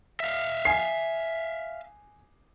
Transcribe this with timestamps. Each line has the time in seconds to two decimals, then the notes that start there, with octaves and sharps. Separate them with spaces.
0.20 E5 F5
0.65 G#5 C7